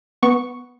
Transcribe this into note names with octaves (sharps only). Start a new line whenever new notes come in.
B3 C#6